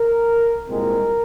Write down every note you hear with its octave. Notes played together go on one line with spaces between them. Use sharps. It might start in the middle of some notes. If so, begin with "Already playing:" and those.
Already playing: A#4
C2 A#2 G#3 C4 A#4